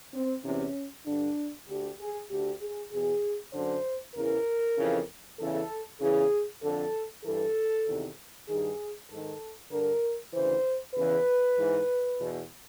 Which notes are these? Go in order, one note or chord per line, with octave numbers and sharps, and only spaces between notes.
C4
E2 C3 E3 C#4
G2 D3 D4
D2 D3 G4
G#4
D2 D3 G4
G#4
E2 B2 G#4
F#2 D3 C5
E2 C#3 E3 A#4
F2 C#3 E3
E2 C#3 E3 A4
E2 C#3 E3 G#4
F2 D3 A4
G2 E3 A4
E2 C3 D#3
G2 D#3 G#4
G#2 D#3 A4
G2 D3 A#4
D2 C#3 E3 C5
E2 C#3 E3 B4
G#2 E3
E2 B2